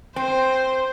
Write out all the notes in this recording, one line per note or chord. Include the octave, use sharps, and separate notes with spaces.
C4 C5